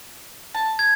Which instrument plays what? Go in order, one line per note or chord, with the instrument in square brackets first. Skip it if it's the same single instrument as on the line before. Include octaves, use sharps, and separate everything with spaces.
[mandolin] A5
[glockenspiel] G#6